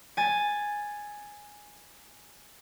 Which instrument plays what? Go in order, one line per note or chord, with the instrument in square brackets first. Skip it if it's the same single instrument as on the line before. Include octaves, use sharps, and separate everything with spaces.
[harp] G#5 A6